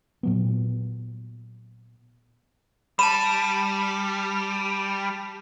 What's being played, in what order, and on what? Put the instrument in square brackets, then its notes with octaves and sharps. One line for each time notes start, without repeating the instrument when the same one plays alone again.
[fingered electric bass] A#2 F#3 B3
[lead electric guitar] G3 [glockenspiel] A5 D#7 E7 [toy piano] B5